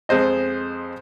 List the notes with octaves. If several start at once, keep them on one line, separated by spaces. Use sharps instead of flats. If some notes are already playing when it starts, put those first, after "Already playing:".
F2 G#3 C5 D#5